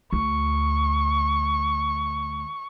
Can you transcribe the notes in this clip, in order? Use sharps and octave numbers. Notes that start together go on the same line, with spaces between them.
D2 C#6